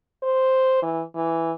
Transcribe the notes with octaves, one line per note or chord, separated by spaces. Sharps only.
C5
E3
E3